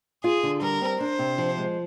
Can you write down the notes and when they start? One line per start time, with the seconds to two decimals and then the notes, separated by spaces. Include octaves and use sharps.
0.24 F4 G#4
0.43 D3
0.61 G3 A#4
0.81 C4
1.00 D4 C5
1.19 C3
1.38 F3
1.58 G#3